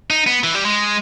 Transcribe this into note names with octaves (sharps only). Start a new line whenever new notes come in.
D#4
B3
E3
G3
G#3